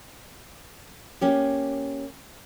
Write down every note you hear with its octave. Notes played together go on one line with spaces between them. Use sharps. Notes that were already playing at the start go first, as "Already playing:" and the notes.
A#3 C#4 G4